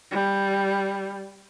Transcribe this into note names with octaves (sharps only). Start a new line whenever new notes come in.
G3